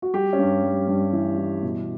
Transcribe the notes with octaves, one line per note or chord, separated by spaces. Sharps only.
F#4
G3 G4
C#4
G2
G3
G2 G3
E3
E3
B2